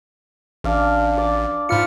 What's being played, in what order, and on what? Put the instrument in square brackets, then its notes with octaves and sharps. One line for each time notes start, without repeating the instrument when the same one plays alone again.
[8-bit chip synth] A1 [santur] D4 F5 D6
[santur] D5 D6
[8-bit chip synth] G#2 F6 C#7 [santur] F4 B5